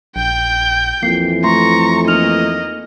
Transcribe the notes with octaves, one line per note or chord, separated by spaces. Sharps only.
A#1 G5 G6
F2 E3 A#3 C7
A3 A#5 C6 C#6
A#3 D#4 D#5 F6 F7